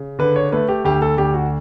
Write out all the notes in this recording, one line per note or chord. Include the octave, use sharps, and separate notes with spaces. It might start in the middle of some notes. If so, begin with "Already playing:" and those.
Already playing: C#3
D3 B4
C#5
A3 B4
G4
D2 G4
A4
D2 G4
F#4